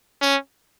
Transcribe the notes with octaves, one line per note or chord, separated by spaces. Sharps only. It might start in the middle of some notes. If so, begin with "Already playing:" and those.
C#4